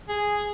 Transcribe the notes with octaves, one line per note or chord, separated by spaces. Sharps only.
G#4